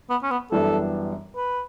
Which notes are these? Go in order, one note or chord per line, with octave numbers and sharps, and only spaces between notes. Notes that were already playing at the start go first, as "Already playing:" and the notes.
B3
C#4
B3
F#2 E3 G3 B3 D4 A4
B4